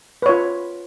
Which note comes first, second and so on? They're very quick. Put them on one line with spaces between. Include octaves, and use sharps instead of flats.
B4 C#5 F4